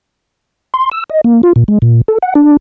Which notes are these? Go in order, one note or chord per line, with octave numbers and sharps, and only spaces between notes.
C6
E6
D#5
A#3
F4
A#2
G#3
A#2
A4
F#5
D4